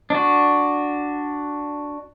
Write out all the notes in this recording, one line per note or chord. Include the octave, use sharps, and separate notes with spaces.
D4 F#4